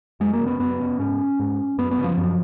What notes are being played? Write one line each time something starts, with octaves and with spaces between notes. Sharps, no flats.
F#2 G#3
A#3
C#3
B3
F#2 B3
C#3
G#2 C#4
G#2
F#2 B3
B3
C#3
F3
F#2